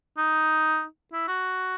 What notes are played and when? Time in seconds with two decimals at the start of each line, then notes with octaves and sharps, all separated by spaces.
0.18 D#4
1.13 E4
1.28 F#4